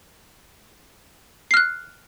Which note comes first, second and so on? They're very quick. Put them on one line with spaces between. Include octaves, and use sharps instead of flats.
C7 F6 F#6